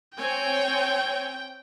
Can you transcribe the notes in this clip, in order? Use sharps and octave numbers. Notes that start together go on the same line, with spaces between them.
C4 C#5 G5 G#5